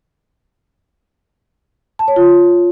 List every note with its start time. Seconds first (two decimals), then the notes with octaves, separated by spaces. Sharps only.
1.99 A5
2.08 C#5
2.16 F4